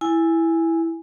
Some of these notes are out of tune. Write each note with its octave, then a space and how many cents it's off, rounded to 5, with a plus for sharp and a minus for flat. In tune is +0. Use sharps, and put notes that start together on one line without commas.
E4 +0 G#5 -5